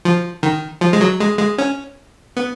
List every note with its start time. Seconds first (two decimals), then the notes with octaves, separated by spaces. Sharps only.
0.05 F3
0.43 D#3
0.81 F3
0.93 G#3
1.01 F#3
1.20 G#3
1.39 G#3
1.58 C#4
2.37 B3